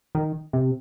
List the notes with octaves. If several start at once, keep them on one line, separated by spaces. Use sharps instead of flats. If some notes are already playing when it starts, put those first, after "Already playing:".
D#3
C3